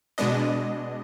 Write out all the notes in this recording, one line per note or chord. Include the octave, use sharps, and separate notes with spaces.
B2 G#3 B3 D4 D#5